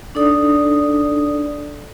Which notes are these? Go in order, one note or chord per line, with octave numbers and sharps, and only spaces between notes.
D4 D#4 A4 D5 D#6